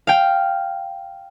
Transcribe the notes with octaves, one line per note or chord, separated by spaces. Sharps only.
F5 G5